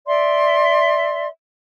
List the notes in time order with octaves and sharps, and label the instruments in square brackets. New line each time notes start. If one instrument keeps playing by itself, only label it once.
[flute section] D5 E5 C6